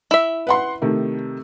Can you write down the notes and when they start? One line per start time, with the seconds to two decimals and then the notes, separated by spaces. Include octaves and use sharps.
0.11 E4 E5
0.47 B4 F#5 C6
0.82 C3 D#3 A3